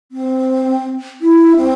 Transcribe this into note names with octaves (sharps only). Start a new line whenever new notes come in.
C4
E4
C4